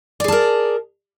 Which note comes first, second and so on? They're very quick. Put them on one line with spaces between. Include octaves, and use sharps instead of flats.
D5 G#4 A5 A#4